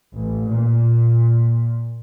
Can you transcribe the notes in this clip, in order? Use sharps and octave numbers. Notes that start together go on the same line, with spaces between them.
A1
A#2